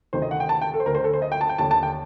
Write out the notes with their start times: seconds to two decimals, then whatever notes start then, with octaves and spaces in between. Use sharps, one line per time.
0.13 D2 C3 D#3 C5
0.22 D#5
0.31 F#5
0.40 G5
0.49 A5
0.61 G5
0.74 A4
0.80 C5
0.86 D2 D3 A#4
0.95 C5
1.04 A4
1.13 C5
1.22 D#5
1.32 G5
1.41 A5
1.49 G5
1.58 D#2 D3 A5
1.71 A5
1.83 G5